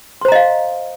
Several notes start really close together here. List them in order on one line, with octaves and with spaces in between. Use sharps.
C6 C5 A#5 D#5 F5